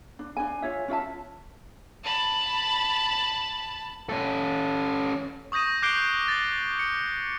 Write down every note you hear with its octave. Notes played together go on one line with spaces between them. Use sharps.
D4
D4 G#5
F4 C#5 E5
C#4 F4 E5 A5
A5 B5
C#4 A4
C#6 D#6 G6 A#6 D#7
D6 F#6 G6 C7 D7 G7
A6
C#7